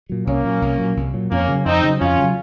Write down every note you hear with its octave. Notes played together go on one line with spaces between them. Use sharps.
A#2 F#3
C2 A#3 C#4
A#2 F#3
C2
A#2 F#3
C2
A#2 F#3
F2 A#3 C#4
C#3 F#3
F2 C4 D#4
C#3 F#3
F2 C#4 F4
C#3 F#3